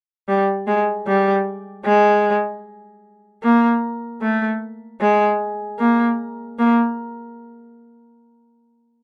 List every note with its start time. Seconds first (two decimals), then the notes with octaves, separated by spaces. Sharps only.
0.28 G3
0.67 G#3
1.07 G3
1.85 G#3
3.43 A#3
4.21 A3
5.00 G#3
5.79 A#3
6.58 A#3